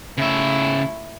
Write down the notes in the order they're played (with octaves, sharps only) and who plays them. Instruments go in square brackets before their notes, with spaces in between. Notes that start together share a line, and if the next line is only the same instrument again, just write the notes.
[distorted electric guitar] C#3 E5 [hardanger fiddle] A3 E4